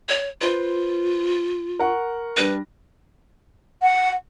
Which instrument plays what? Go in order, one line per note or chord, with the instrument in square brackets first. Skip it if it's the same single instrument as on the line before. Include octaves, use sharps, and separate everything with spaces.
[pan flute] C#5
[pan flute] F4 [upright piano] B4 C5
[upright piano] A#4 F#5 C#6
[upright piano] G3 D4 A#6 [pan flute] B4
[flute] F#5